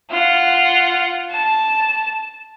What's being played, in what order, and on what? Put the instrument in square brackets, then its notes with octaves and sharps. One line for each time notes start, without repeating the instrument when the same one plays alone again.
[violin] F4 F#5
A5